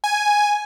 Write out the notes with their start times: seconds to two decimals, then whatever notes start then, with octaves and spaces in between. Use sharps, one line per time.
0.04 G#5